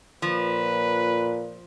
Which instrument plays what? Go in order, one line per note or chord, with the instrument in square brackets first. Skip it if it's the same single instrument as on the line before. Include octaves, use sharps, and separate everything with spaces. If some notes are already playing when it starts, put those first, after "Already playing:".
[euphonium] A#2 [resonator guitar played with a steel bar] F3 [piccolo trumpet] B4